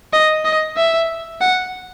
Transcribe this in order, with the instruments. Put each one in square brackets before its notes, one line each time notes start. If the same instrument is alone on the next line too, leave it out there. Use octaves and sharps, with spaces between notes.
[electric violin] D#5
D#5
E5
F#5